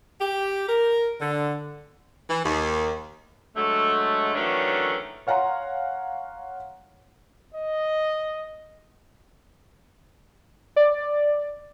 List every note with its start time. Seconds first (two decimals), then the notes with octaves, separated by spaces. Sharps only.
0.21 G4
0.68 A#4
1.20 D3
2.30 E3
2.45 D#2
3.56 D3 F#3 G#3 A3
4.35 D#3 E3 F#3 A3 C#4 D4
5.27 C#5 F5 F#5 G#5 A#5 C6
7.54 D#5
10.76 D5